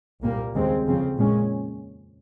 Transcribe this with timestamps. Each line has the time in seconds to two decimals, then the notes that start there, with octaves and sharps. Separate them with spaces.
0.23 C2 A#2 G3 A#3
0.54 D#2 C#3 G#3 C4
0.86 F2 C#3 F3 C4
1.17 A#2 G#3 C#4